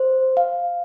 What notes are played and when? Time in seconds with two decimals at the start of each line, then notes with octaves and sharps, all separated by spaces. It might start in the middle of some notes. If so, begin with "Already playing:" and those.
Already playing: C5
0.37 F5